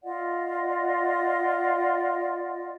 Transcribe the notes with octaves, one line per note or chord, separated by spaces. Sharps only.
F4 D5 D#5 F#5